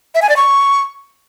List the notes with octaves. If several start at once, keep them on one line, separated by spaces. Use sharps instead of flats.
E5
G#5
D5
C#6